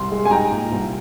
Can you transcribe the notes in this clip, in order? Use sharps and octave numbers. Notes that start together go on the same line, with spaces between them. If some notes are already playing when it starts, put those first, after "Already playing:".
Already playing: C2 C6
G#3
G#5
D#4 G5 A#5
A#2
C2